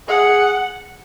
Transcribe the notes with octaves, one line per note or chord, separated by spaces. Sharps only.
G#4 F#5